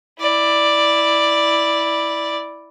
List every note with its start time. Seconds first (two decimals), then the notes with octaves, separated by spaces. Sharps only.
0.20 E4 D5